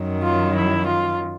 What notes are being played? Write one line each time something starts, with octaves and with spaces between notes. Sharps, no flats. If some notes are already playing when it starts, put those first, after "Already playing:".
Already playing: F#2 D#3 F#3
F4
E4
F4